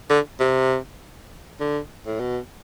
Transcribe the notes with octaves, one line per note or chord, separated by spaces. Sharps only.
D3
C3
D3
A2
B2